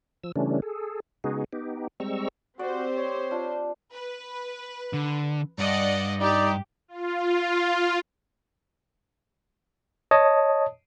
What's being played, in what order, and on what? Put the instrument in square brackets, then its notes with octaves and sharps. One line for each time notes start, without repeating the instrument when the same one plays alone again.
[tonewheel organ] F3 E6
C#3 E3 G3 A3 C#4 D4
G#4 A4
C#3 G#3 B3 D#4 F#4 G#4
B3 D#4 G4
G3 G#3 C4 A#5 C#6 E6
[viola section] C4 G4 C5 [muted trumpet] F#4 [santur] D5 D6
[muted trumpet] C#5
[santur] D4 F4
[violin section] B4
[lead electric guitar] D3
[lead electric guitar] G2 [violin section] D5 D#5 F#5
[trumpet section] D#4 D5 [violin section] G4
[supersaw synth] F4
[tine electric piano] C#5 D#5 A5 D#6